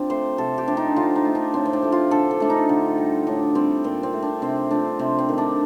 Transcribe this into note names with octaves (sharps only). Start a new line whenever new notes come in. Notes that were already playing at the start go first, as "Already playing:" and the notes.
Already playing: F3 C4 D4
A3 C5
C3 A4
G4
F3 A3 D4
D#4
D3 F4
D#4
A3
D4
A2 C4
C4
D4
F3 A3
F4
D3 A4
A4
A3 D4
D#4
D3
G3
A2 D4
G3 C4
A#2 C4
C4
A3
D4
C3 C4
F3 A3 D4
C3 C4
C4
D#3 A3
D4